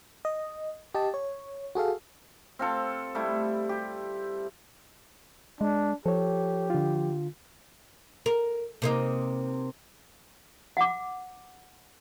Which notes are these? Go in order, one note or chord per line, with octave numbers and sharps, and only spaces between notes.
D#5
G4 D#5 A5
C#5
F#4 G#4 A4 F5
C4 F4 A4
G3 A3 E4
G4
G#3 D4
F3 G4 A4 C#5
D3 F4
A#4
C3 A#3 D#4
F#5 D6